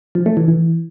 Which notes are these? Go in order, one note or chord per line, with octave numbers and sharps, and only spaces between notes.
F3
A3
E3
E3